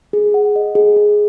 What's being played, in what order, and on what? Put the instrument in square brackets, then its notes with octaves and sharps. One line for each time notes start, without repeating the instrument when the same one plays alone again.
[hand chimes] G#4
F#5
D#5
G#4
G#4